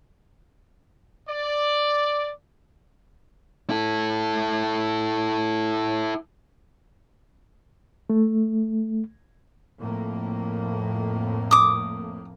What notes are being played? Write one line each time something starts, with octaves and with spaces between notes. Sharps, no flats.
D5
E4 A4
A3
F2 A2 A#3
D6 D#6